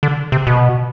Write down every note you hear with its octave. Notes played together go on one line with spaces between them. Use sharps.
D3
C3
B2